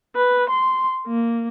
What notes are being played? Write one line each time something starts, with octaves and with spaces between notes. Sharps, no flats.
B4
C6
A#3